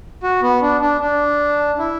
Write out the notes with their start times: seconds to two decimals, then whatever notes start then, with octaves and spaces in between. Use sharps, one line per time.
0.23 F#4
0.42 B3
0.62 D4
0.81 D4
1.01 D4
1.79 E4